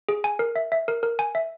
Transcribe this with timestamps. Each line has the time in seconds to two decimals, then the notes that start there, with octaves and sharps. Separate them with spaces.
0.09 G#4
0.24 G#5
0.39 A#4
0.56 E5
0.72 E5
0.88 A#4
1.03 A#4
1.19 G#5
1.35 E5